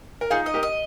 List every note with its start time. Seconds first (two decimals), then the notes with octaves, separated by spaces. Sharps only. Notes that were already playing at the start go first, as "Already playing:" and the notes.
0.21 A#4
0.30 D#4 F4 G#4
0.46 D#5
0.54 G4 A#4
0.63 D#5